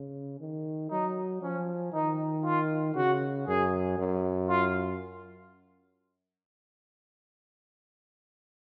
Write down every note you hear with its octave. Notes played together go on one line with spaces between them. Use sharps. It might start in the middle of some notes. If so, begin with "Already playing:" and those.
Already playing: C#3
D#3
F#3 D#4
F3 C#4
D#3 D#4
F4
C#3 F#4
F#2 G#4
F#2
F4